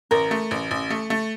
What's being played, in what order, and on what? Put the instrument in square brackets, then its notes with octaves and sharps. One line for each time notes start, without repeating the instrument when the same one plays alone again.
[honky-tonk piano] A1 [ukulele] A#4
[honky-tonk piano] A3
A1
A1
A3
A3